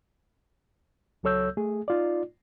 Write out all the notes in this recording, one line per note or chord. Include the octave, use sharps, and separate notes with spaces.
C#2 F#3 A4 C#5 E6 G6
A3 G#4
D#4 F4 D5